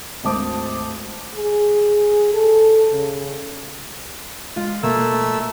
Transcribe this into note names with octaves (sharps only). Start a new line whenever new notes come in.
G#1 D2 C5 A5 D6 D#6
G#4
A4
C#3
G#3 F4
B2 A3 A#3 E6